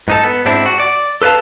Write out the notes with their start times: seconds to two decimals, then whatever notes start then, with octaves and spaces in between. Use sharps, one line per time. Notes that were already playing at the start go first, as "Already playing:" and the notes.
0.08 G#2 D#4 A4
0.24 B3
0.46 G#2 C4 D4 E4
0.66 F#4
0.80 D5
1.22 A4 B4 C#5 F5 A5